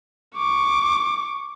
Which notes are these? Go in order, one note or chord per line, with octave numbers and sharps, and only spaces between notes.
C#6 D6